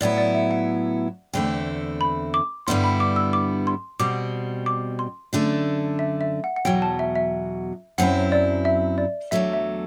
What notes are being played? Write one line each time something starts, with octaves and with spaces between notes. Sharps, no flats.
A2 F#3 B3 E4 D5
D5
E5
F#5
E2 D3 A3 C4 E4 G5
B5
D6
G2 D3 G3 B3 E4 C6
B5
D6
E6
D6
C6
B2 G3 C4 D6
D6
C6
F#2 D3 A3 D4
E5
E5
F#5
F#5
E2 B2 F#3 G5
A5
E5
E5
F#2 F#3 C4 E4 F#5
D5
E5
D5
E2 D3 F#3 A3 E5
E5